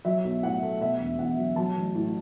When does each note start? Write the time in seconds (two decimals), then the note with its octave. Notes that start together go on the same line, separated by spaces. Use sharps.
0.05 F#3 E5
0.24 B1
0.42 A2 F#5
0.62 A3
0.80 B2 E5
0.99 E1
1.19 E2 F#5
1.37 F#3
1.56 F#3 A5
1.75 A1
1.95 A2